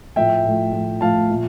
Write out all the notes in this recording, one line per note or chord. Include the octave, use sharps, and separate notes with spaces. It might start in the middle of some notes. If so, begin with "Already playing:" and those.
A2 F3 A3 E5 G5
A2 F3 A3
A2 F3 A3
A2 F3 A3 F5 A5
A#2 F3 A3